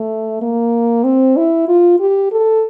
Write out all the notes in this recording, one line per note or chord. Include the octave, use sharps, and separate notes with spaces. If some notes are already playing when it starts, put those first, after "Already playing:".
Already playing: A3
A#3
C4
E4
F4
G4
A4